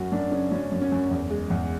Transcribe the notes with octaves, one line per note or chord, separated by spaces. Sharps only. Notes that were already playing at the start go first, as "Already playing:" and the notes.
Already playing: F#2 F#4
F#2 D4
C#3 C#4
F#2 C#4
F#2
C#4
F#2
E2
G#3
E2